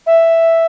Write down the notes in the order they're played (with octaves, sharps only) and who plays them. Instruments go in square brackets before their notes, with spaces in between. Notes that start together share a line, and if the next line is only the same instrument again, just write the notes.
[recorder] E5